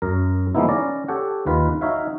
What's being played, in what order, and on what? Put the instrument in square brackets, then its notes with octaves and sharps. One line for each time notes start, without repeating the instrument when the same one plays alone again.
[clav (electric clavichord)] F#2 A#4
F3 G#3 A#3 B3 D#4 E4
C#4 D5 A#5
G4 A4 C#5 F#5 G5
D#2 D#3 F4 B4
D#4 F#4 C#5 E5 F5